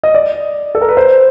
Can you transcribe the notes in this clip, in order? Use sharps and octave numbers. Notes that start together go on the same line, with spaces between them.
D#5
D5
A4
A#4
B4
C5